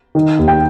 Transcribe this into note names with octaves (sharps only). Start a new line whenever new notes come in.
D#3
D#2
G5